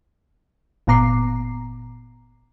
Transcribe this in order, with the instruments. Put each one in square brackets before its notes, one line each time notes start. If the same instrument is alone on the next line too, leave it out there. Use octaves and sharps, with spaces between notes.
[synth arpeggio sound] G1 A#2 B3 A#5 D6 C7